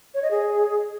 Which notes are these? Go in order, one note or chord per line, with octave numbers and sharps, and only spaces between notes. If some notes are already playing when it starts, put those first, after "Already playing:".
C#5
D#5
G#4